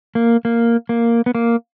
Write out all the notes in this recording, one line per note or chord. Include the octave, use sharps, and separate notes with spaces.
A#3
A#3
A#3
B3
A#3